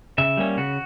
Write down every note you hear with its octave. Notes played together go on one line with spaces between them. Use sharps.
C#3 E5
G3 A#3 C#4
C#3 F#4